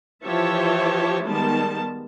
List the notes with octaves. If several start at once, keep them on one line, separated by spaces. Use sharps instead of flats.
E3 F3 G4 C#5 E5 A5
D#3 G3 G#3 B3 A5